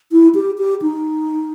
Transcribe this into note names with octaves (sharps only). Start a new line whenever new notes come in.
E4
G4
G4
D#4